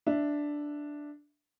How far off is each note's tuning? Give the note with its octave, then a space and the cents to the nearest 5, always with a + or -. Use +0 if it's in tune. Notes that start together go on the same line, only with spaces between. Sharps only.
D4 +0 E5 +0